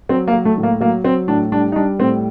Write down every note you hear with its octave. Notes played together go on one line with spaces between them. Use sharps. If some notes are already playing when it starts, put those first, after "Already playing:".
F#3 C4
A#3
F#3
A3
A2
A#3
F#3 A#3
F#3 C4
A2 D4
G3 D4
D#4
G3 D4
A2 C4